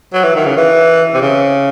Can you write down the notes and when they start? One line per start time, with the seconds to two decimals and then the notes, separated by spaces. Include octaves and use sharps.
0.14 F#3
0.24 E3
0.35 D#3
0.46 C#3
0.57 E3
1.14 C3
1.21 C#3